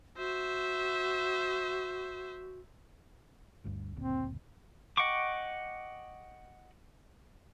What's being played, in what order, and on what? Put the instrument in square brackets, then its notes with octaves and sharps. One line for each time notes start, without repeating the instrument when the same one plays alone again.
[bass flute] F#4 [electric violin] C5 E5
[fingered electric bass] G1 D2 G2
[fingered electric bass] F#1 D2 A#2 [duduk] C4
[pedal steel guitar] D#5 F#5 G5 C#6 D6